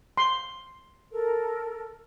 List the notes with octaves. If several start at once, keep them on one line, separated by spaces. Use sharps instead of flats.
C6
A4 A#4